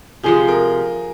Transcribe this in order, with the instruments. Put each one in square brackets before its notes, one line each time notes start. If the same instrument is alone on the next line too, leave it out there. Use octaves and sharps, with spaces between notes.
[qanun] C3 F3 G#3 [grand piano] G#4
[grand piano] A#4